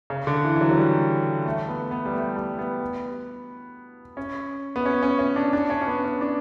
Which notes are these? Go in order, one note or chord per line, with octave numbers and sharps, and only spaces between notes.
C#3
D3
E3
E3
F#3
F#3
G3
A3
B3
B3
G3
A3
G3
B3
C#4
B3
C#4
C#4
C#4
D4
D4
C#4
C#4
B3
C#4
D4